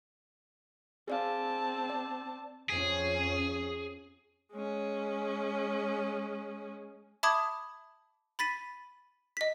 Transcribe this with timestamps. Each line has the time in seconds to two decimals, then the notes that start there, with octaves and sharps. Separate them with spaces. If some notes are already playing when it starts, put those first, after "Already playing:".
1.08 C4 G#4 D5 F5 A5
1.89 D5
2.70 F2 C#4 G#4
4.51 G#3 C#4
7.23 E5 A5 B5 D6 D#6 G#6
8.39 B5 A6 B6 D#7
9.37 D#5 B6